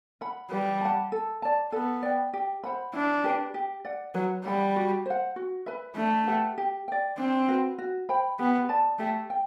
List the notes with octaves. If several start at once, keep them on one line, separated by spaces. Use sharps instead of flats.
F#5 B5
G3 B4
F#5 A5
A4
D5 A5
B3 A4
D5 G5
G4
C5 F#5 B5
D4 E4
G4 B4
G4
D5 F#5
F#3 B4
G3 F#5 B5
F#4
C5 F#5
F#4
B4 E5 B5
A3 D4
G4 B4 F#5
G4
D5 G5
C4 D4
F#4 B4
F#4
C5 G5 B5
B3 G4
D5 A5
A3 G4
G5